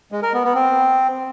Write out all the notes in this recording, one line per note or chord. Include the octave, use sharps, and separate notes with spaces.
G#3
A#4
B3
B3
C4